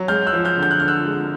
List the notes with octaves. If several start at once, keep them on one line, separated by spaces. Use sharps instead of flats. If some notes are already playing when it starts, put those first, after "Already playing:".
Already playing: F#3
G#3 F6 G6
E6 F#6
F3
F6 G6
D3
G6
F#6
D3 F6
E6 F#6
G#3